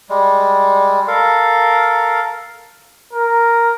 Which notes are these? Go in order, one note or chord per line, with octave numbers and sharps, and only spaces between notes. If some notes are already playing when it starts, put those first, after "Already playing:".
G3 G#3
A4 A#4 F5
A#4